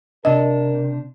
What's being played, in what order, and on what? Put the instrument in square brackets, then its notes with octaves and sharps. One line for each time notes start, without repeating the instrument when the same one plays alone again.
[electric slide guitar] C3 D4 [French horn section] A#4 [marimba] D#5